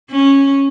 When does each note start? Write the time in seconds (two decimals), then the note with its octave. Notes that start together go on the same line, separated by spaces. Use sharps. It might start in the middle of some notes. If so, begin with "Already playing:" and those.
0.11 C#4